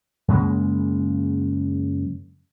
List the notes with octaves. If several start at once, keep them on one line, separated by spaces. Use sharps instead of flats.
F#2 C#3 G#3 A#3